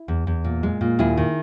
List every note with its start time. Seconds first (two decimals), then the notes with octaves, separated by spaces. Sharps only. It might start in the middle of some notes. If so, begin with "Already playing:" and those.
Already playing: E4
0.08 E2
0.27 E2
0.44 A#2
0.63 G#3
0.81 A#2
0.99 D#2 E4 G#4
1.17 D#3